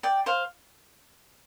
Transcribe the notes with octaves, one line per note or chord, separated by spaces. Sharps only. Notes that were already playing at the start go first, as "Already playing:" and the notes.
D5 G5
C5 F5